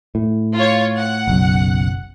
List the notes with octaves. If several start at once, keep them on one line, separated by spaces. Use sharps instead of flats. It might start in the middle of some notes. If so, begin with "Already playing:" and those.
A2
F4 C#5
F#5
F#1 B1 F#2